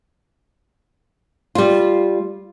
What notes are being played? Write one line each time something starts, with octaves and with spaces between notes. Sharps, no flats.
G3 F4